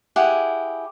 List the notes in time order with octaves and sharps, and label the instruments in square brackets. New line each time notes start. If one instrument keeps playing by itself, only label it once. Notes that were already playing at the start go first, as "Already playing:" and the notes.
[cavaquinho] E4 G4 G#4 F#5